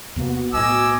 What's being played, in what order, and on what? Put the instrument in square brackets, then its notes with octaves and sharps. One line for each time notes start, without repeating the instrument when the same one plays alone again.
[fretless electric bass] E2 C3 A#3 [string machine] B3 F#4
[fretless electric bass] B1 A2 [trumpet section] D#5 G#5 D6 [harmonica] E6